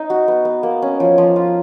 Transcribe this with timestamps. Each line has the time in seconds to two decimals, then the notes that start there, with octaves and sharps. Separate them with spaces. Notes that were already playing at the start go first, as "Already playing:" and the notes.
Already playing: D#4
0.10 F#4
0.28 B3
0.45 B3
0.63 A#3
0.82 C#4
1.00 F3
1.18 F3
1.36 F4